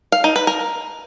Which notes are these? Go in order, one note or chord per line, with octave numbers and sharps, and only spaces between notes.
F5
D#4
B4
A#4